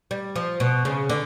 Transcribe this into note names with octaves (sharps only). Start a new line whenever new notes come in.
G3
F3
B2
C#3
D3